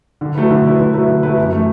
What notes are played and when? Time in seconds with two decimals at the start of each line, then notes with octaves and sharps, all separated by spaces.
0.21 D3
0.35 F#3 A3 E4 B4
0.50 D3
0.65 F#3 A3 E4 B4
0.79 D3
0.93 F#3 A3 E4 B4
1.08 D3
1.23 F#3 A3 E4 B4
1.37 F#2
1.52 E3 A3